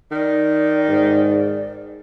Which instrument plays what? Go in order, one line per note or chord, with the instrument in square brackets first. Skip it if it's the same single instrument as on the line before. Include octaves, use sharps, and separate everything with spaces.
[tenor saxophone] D#3 [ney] D5
[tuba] G#2